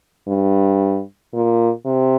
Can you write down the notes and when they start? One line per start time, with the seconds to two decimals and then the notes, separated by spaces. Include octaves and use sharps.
0.27 G2
1.33 A#2
1.86 C3